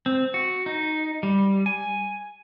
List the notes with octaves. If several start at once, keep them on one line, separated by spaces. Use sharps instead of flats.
C4
F#4
D#4
G3
G#5